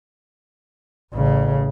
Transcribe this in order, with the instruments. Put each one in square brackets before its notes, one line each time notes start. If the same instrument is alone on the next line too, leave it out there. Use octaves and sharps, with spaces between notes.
[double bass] A1 C#3